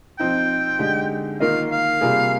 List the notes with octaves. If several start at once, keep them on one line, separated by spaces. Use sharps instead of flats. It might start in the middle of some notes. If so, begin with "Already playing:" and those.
F3 C4 D#4 G5
D3 G#3 D#4 G4
D#3 A#3 F4 A#4 D#5 F5
F5
C3 G3 A#3 F4 G#4